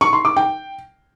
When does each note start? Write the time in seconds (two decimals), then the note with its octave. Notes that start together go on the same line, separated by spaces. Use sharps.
0.01 C#6
0.13 C6
0.25 D6
0.36 G5